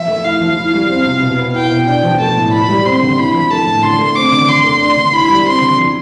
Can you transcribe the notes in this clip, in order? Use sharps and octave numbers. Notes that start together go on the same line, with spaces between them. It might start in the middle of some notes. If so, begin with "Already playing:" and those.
Already playing: F3 E5
A3
E4 F5
F3
E4
G3
C4
C3
B2
B3
E4 G5
B2
D4 G5
F3
A3 A5
A2
E4 B5
G3
C4 C6
D3
E4 B5
F3
A3 A5
A2
D3 C6
A3
C4 D6
D3
D3 C6
A3
D4
D3
E4 B5
G3
C4 C6
D3
F3